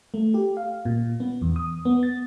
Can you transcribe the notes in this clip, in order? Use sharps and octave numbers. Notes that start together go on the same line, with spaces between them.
A3
G4
F5
A#2
B3
E2
D#6
B3
A6